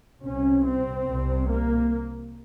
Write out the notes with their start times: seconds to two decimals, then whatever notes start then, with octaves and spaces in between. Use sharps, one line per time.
0.22 C2 C3 C#4
0.65 C4
1.08 C2 C3
1.50 A#3